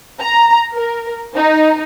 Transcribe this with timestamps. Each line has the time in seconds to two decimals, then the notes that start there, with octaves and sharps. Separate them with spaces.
0.19 A#5
0.73 A#4
1.35 D#4